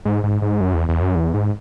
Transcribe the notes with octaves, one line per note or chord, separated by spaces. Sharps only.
G#2
G#2
G#2
F#2
E2
E2
F#2
E2
G#2